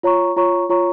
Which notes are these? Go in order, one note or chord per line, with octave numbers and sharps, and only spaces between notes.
F4 C#5 A#5 C#6
F4 C#5 A#5 C#6
F4 C#5 A#5 C#6